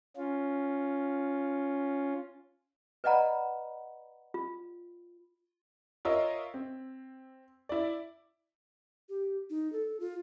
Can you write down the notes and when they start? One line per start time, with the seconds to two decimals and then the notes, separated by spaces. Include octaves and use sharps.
0.17 C#4 F4
3.04 B4 D5 D#5 F#5 A#5 B5
4.34 F4
6.05 F4 A#4 C#5 D#5 E5
6.54 C4
7.69 E4 D5
9.09 G4
9.50 D#4
9.72 A4
10.00 F4